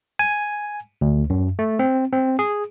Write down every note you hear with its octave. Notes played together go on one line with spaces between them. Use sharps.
G#5
D2
F#2
A3
C4
C4
G#4